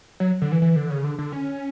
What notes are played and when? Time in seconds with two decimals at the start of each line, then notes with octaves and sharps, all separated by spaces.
0.20 F#3
0.42 D3
0.52 E3
0.62 E3
0.76 D3
0.90 C#3
1.04 D3
1.19 D3
1.33 C#4